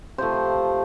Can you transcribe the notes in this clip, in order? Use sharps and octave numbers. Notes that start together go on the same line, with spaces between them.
C3 F3 A3 C5